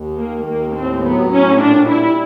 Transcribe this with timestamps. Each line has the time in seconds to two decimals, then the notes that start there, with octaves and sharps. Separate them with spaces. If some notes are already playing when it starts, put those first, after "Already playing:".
Already playing: D#2
0.18 D#3 A#3
0.46 D#2 A#3
0.75 A2 C4
1.03 F#3 B3
1.32 A2 C#4
1.60 A#2 D4
1.88 G3 E4